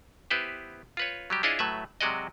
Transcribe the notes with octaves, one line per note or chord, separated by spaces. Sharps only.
B3 E4 G4 B4 C5
F4 B4 C#5
F#3 G3 G4
D4 E4 F4 G#4 C#5 D#5
A2 F#3 A3 B4 E5
C3 F#3 G#3 F#4 D5 D#5